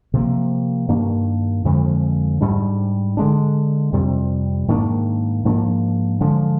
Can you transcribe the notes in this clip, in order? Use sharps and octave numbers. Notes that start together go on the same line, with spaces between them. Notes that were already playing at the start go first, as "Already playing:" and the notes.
C3 F3 A#3
G2 D#3 A#3 D4
F2 D3 F3 G#3
G#2 G3 D4
D3 G#3 D4
F2 C3 G3
G#2 D#3 A#3 D4
G#2 F3 A#3 D4
D3 F3 G#3 D4